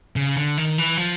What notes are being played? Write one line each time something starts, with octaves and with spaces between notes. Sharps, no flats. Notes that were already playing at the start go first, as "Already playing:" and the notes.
C#3
D3
D#3
E3
F3